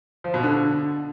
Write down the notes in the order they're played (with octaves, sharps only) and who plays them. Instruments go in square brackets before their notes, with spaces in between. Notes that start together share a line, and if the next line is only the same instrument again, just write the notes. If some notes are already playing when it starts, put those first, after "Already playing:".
[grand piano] F3
B2
D3